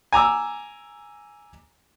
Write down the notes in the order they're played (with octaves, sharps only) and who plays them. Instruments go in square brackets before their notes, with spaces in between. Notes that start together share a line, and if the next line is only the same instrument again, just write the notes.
[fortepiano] G#5 A#5 D6 E6